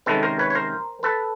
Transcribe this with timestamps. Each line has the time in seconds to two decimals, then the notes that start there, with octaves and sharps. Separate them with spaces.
0.06 C3 D#3 G#3 C#4 A4 B4
0.23 A#4 C5
0.39 B4 C#5
0.50 C#5
0.55 A#4 C5
1.03 A4 B4